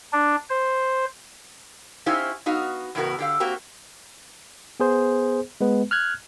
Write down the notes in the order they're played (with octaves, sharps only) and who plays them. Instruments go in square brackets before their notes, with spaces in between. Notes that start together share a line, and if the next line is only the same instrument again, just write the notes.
[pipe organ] D4
C5
[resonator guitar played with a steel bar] C#4 D#4 E4 G4 C5 F5
B3 D#4 F#4 F5
E2 A2 C#3 B3 F#4 A#4
D3 G4 F5
A#3 C4 F#4 G4 A#5
[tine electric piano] B3 G#4 C5
G#3 B3 B4
F6 F#6 G#6